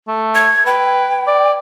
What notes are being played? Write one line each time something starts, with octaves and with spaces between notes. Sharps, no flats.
A3
G#6
B4 G5
D5